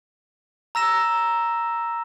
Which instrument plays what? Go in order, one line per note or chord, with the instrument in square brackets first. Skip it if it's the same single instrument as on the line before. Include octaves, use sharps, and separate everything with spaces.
[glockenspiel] A#5 E6 A#6 E7